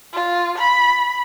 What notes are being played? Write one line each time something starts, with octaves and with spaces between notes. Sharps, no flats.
F4
B5